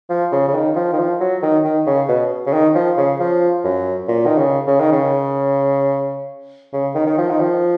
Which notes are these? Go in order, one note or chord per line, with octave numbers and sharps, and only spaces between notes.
F3
C#3
C#3
D#3
F3
D#3
F3
F#3
D#3
D#3
C#3
B2
C#3
D#3
F3
C#3
F3
F#2
A#2
D#3
C#3
C#3
D#3
C#3
C#3
D#3
D#3
F3
D#3
F3